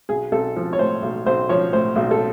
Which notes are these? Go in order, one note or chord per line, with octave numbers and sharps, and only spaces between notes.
B1 G#4
B1 A4
F3
C#5
A2 C5
B1
B1 C5
F3 C#5
A2 C5
B1
A4